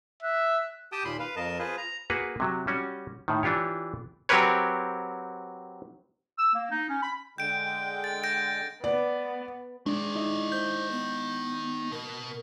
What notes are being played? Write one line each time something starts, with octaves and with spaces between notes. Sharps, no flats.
E5 F#6
G4 G5 A5 D#6
D#2 A#2 B5 C6
B4 F5
F2 A#4 D#5 A5
F4 G#4 B4 C5
A#5
A#3 F#4 G#4 B4
C3 F#3
G3 C#4 F#4
A2 D#3
E3 D4 F4 G4 C#5
F#3 C4 G4 A#4 B4 C#5
E6
A#3
D#4
C#4
B5
D3 G#3 G5 G6 D7
A6
G6 A#6 D7
B3 D5
D#3 G#3 D4 D5
D#4 E4 D#5
C5 G6
B3
B2 A#4